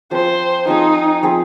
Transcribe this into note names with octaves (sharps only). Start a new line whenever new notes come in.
F3 C4 G#4 C5
F3 C4 D#4 G#4
F3 C4 G#4